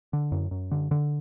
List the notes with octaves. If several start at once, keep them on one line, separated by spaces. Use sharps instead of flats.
D3
F#2
F#2
D3
D3